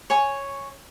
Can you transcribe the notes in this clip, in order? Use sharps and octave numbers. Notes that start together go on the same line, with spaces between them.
C#5 G#5 C#6